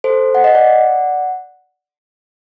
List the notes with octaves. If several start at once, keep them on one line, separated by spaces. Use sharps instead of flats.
A4 C5
F#5
D#5
D5 F#5